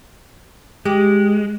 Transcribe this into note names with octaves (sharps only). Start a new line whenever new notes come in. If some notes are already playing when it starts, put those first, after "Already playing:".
G#3 G4